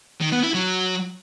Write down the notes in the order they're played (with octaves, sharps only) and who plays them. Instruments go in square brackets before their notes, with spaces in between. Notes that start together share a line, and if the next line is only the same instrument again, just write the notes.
[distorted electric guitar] D#3
B3
E4
F#3